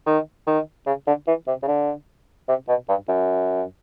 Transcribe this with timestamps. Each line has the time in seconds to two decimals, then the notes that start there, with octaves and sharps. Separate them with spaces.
0.06 D#3
0.47 D#3
0.87 C#3
1.07 D3
1.27 E3
1.47 C3
1.63 C#3
1.68 D3
2.48 C3
2.68 B2
2.89 G2
3.08 F#2